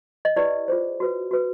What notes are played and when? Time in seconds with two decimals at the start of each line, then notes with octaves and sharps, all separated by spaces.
0.25 D#5
0.36 E4 G4 B4 D5
0.68 F4 G#4 C5
1.00 F#4 B4
1.31 F#4 B4